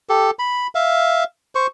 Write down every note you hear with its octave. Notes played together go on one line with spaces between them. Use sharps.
G4 A4
B5
E5 F5
C5 C#6